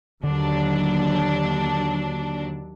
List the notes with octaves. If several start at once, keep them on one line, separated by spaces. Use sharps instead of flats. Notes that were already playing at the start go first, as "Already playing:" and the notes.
D#2 D3 F#3 D4